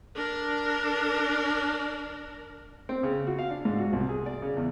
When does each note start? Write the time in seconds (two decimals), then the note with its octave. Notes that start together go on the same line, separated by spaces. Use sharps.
0.15 D4 A#4
2.89 C4
3.03 C#3
3.27 F#4
3.39 F5
3.50 D4
3.65 G#2
3.79 F#4
3.93 C2
4.09 G#4
4.26 D5
4.42 C#3
4.57 E2